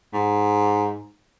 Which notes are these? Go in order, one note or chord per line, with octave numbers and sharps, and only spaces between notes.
G#2